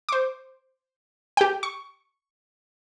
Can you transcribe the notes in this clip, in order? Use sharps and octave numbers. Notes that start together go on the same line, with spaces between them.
C5 D6
G4 G5
C#6